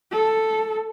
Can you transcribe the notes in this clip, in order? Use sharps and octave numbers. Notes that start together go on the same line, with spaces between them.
A4